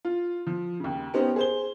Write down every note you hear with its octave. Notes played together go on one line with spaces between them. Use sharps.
F4
F3
D#2 C#3
B3 C#4 D#4 G4 C5
G#4 C5 G7